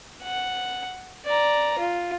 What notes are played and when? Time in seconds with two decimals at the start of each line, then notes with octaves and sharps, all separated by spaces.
0.23 F#5
1.26 D5 A#5
1.78 F4